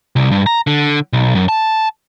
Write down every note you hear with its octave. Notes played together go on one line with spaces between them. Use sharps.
C2
G2
A#5
D3
B1
F#2
A5